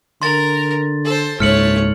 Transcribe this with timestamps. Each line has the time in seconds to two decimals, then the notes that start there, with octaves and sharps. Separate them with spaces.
0.22 D3 A#4 C6 A6
1.05 A4 C5
1.40 F#1 C#2 G#2 A3 C#5 F6 C#7 F#7